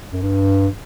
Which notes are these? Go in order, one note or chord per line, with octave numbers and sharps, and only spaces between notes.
F#2
G2